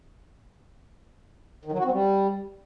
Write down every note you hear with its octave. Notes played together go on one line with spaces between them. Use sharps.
D#3
F#3
F#4
C4
G3